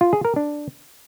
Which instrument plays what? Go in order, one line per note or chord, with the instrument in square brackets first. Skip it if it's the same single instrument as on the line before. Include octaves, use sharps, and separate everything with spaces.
[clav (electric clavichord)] F4
G#4
A#4
D4